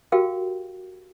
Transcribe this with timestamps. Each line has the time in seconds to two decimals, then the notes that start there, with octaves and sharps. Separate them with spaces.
0.12 F#4 G4 A#4 F5 G5